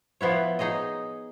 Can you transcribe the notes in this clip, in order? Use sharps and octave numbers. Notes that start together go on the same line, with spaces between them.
F3 B3 E4 C#5
D#4 G#4 C#5 D#5